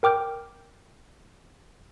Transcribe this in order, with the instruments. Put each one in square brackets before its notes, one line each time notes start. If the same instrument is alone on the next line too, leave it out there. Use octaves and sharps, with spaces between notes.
[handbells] A#4 G5 D6 F6 G6